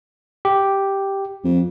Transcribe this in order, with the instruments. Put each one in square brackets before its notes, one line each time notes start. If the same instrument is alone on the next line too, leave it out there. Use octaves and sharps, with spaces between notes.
[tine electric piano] G4
[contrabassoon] F2